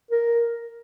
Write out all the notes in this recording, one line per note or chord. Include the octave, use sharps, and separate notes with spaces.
A#4